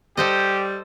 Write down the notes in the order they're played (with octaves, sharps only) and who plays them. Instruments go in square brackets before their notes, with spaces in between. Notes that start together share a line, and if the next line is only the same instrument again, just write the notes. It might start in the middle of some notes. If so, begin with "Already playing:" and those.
[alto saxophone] G3 [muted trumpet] G4 [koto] A4 C5 D#5